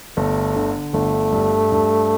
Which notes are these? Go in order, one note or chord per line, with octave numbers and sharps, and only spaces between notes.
G1 A3
D3
G1 A3
G2
G2